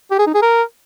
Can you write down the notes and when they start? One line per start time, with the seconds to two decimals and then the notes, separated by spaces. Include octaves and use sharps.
0.11 G4
0.19 G#4
0.27 D#4
0.34 G#4
0.42 A#4